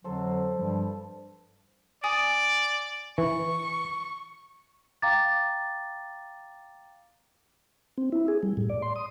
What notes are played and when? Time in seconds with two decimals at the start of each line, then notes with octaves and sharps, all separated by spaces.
0.04 F2 D3 F#3 A4 C5
0.55 G2 F3 G3
2.04 D5 G#5 D#6
3.18 E3 C#6
5.02 F5 G5 A#5 D6 A6
7.98 C4
8.12 E4
8.28 G#4
8.43 G3
8.57 A2
8.70 D5
8.82 C6
8.96 D#6